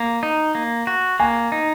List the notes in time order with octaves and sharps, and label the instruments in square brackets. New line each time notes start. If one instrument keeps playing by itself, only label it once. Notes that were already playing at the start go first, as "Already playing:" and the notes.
Already playing: [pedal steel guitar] A#3
D#4
A#3
F#4
[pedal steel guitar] A#3 [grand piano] G#5
[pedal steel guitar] D#4